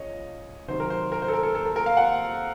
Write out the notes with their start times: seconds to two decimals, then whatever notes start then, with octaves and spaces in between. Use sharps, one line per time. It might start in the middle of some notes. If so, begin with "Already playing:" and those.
Already playing: C#2 C#3 C#5 D#5
0.68 C3 D#3 F#3 C5
0.80 A#4
0.90 C5
1.12 A#4
1.22 C5
1.28 A4
1.33 A#4
1.43 A4
1.55 A4
1.65 A#4
1.76 A#4
1.86 F5
1.97 F#5